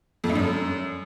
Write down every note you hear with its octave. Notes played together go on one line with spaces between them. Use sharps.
F2
G2
F#2